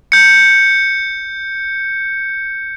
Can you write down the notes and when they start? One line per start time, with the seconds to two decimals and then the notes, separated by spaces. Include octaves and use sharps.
0.12 G6 C#7